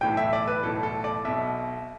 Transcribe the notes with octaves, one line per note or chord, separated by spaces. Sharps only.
B1 A2 E3 G5
E5
D5
B4
B1 A2 E3 A4
A4
D5
B1 B2 E5